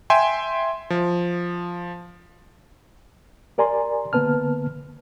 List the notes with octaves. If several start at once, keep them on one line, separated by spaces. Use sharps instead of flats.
E5 G5 G#5 C6
F3
G4 A#4 D5 G#5 A#5 C6
D3 A#3 B3 B4 A5 F6